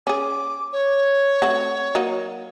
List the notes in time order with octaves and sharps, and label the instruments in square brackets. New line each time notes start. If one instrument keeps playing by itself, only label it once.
[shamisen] C#4 G#4 [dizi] D6
[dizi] C#5
[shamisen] A3 C4 F#4
F#3 A#3 D#4